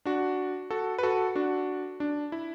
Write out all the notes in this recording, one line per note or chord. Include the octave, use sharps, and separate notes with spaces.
D4 F#4
F#4 A4
B4
F#4 A4
D4 F#4
D4
E4